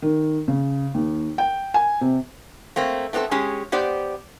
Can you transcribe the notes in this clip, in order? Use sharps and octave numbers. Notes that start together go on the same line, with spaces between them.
D#3
C#3
D#2
G5
G#5
C3
A3 A#3 C4
A3 B3 C4 G4 A4
G#3 C#4 G4 G#4
B3 G4 C5 D5